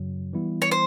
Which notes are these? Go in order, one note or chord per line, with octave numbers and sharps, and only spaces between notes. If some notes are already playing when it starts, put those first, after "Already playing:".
Already playing: F#2 C#3 F#3
E3 G3 B3 E4
C#5
C5